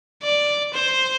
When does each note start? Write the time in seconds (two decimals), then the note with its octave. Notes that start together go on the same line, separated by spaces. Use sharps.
0.23 D5
0.73 C5